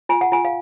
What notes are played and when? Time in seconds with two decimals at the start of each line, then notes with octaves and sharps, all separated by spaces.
0.09 F4 G#5
0.21 F#5
0.32 F4 G#5
0.45 F5